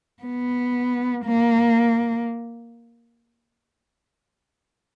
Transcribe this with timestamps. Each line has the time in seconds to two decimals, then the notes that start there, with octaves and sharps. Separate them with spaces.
0.23 B3
1.25 A#3